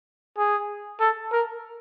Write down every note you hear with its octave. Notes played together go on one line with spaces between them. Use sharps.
G#4
A4
A#4